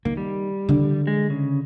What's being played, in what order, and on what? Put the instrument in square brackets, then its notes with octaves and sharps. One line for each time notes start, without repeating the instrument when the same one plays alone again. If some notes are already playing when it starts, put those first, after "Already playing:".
[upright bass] D#3 [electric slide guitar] A#3
[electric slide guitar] G3
[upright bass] D3 E3
[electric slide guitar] G#3
C#3